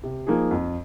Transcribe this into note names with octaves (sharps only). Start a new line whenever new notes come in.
C3
F3 A#3 D#4 G#4
F2